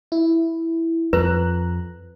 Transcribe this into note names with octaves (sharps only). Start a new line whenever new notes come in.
E4
F2 B4 A#5 F#6